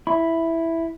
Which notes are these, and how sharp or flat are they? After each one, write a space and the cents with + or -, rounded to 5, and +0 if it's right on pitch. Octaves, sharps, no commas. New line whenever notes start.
E4 +0 B5 +0